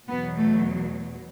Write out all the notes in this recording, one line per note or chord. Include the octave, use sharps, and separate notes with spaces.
E2 B2 F#3 B3
A3